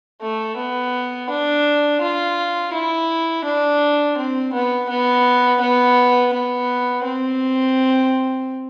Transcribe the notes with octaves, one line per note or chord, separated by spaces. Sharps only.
A3
B3
D4
F4
E4
D4
C4
B3
B3
B3
B3
C4